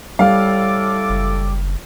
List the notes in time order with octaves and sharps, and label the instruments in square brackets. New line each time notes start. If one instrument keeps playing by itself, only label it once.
[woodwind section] A2 A4 D6 [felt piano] G3 [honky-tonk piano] F5
[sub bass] F#1